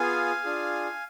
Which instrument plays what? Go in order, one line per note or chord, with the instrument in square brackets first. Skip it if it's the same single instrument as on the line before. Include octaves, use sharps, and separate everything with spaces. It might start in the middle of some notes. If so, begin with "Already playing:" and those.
Already playing: [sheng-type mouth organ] B3 F4 G#4 F5 G#5
D4 F4 G#4